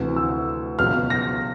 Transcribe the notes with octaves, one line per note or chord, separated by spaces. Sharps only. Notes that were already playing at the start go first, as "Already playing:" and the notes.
Already playing: D2 C3 E3
E6
C#2 B2 F#3 F6
A#6